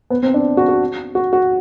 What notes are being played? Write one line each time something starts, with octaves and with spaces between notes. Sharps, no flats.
B3
C4
D4
F#4
F#4
F#4
F#4